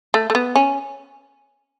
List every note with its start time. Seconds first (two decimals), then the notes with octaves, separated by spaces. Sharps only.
0.14 A3
0.30 A3
0.35 B3
0.56 C#4